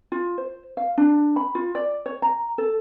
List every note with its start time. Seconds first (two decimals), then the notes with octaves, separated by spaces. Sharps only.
0.12 F4
0.38 C5
0.77 F5
0.98 D4
1.36 B5
1.55 F4
1.75 D5
2.06 C#5
2.22 A#5
2.58 A4